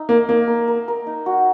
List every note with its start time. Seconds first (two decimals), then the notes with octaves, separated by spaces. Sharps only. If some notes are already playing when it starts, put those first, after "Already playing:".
Already playing: D#4 E5
0.09 A#3 A#4
0.29 A#3 A#4
0.48 A#4
0.68 A#4
0.88 A#4
1.07 D#4
1.26 F#4